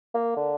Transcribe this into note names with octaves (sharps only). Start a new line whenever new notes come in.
A#3
D3